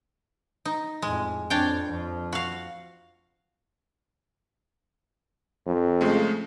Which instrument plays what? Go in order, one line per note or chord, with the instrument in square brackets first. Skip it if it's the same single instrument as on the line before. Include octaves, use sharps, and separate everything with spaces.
[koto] D#4
[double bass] F2 A2 [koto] G#3
[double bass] F2 C4 [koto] D4 C#5 G5
[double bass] F2 F3
[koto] F#4 F5
[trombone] F2
[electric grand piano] C#3 G#3 A3